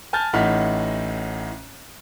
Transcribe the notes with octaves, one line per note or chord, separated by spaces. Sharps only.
G#5 A5 F6 G6 A6
A1 A2 D#4 F#5 F6 B6